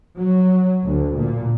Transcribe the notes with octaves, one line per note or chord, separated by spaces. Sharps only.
F#3
D2
A#2